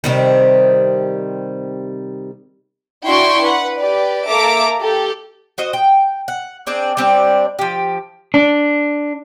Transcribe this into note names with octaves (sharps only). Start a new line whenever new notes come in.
C3 D#3 G3
D4 E4 F#4 G5 C6 C#6
B4 F#5
G4 B4 D5
A#3 A4 E5 A#5 D6 D7
G4 A4
F#4 C5 D#5
G5
F#5
C4 D4 G#4
G3 C4 D4
F3 G4
D4